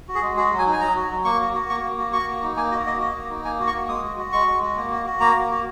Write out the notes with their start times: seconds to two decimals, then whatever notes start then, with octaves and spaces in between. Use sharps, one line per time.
0.08 F#4
0.15 G#4
0.22 G#3
0.37 F#4 G#4
0.52 F#3
0.59 G#5
0.66 D#4
0.73 G#5
0.81 F#3 A#5
0.96 F#4
1.10 F#3
1.25 A#3 C#6
1.40 F#4
1.54 F#4
1.69 A#3 C#6
1.83 A#3
1.98 F#4
2.13 F#4 C#6
2.27 A#3
2.42 D#4
2.57 A#3 G#5
2.71 F#4 D#5
2.86 A#3 D#5
3.00 F#4 D#5
3.15 A#3
3.30 D#4
3.45 A#3 G#5
3.59 F#4
3.67 C#6
3.74 A#3
3.89 G#3 D#6
4.03 F#4
4.18 F#4
4.32 G#3 C#6
4.47 G#3
4.62 F#4
4.76 A#3
4.91 F#4
5.06 F#4
5.20 A#3 A#5
5.35 A#3
5.50 F#4